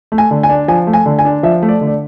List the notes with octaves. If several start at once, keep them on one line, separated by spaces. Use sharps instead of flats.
A3
G#5
D3
G#5
D4
F3 G#5
A3
G#5
D3
G#5
D4
F3 E5
A3
D5
D3
D5